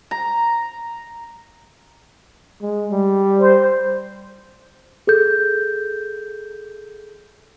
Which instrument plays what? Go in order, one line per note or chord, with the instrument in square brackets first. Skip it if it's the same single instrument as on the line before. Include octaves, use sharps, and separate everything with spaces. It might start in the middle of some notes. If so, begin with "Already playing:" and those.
[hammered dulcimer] A#5
[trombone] G#3
G3
[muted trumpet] C5
[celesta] G#4 A4 G6